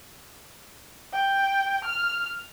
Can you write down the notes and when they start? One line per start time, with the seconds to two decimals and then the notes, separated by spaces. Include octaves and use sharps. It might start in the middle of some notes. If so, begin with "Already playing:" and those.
1.13 G5
1.84 F6